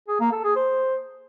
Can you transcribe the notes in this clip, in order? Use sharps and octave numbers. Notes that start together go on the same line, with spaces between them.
G#4
A#3
A4
G#4
C5